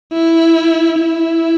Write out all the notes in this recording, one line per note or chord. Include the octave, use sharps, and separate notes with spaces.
E4
E4